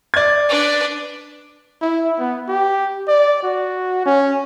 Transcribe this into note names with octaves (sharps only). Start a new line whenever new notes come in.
D5 G#6
D4 B4
E4
B3
G4
D5
F#4
C#4